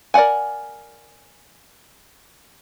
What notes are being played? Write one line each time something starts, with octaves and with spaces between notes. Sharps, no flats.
A#4 D5 F5 F#5 G#5